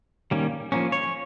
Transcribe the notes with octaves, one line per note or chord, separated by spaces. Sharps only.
D#3 G3 A#3 C#4
F3 A#3 C#4
C#5